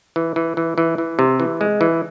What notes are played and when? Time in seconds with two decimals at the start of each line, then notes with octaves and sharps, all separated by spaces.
0.16 E3
0.36 E3
0.57 E3
0.78 E3
0.98 E3
1.19 C3
1.40 E3
1.61 G#3
1.81 E3